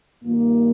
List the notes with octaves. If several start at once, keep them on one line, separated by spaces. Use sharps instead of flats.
G2 D#3 A#3 F4